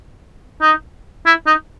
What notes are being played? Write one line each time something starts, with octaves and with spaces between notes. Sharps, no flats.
D#4
E4
D#4